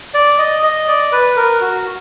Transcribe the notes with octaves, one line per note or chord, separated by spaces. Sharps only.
D5
D#5
D#5
D5
B4
A#4
F#4